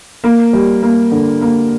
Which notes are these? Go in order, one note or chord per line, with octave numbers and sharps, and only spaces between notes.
A#3
G3
A#3
D3
A#3